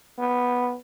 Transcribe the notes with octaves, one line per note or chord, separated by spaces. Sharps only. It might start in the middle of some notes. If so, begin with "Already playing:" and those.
B3